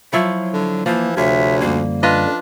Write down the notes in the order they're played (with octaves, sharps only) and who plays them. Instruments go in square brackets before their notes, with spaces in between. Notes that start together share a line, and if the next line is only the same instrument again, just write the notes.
[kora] F3 E4 C#5 [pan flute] F#3
[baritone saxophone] D3
[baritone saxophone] E3 [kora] F3 [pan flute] A#3
[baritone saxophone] D2 [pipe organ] C3 C#5 [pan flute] E5
[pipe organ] F#2 D3 G3 [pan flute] A#3
[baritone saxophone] D4 [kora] F4 B4 D#5